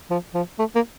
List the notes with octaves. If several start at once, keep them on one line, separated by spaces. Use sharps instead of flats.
F3
F3
A3
A#3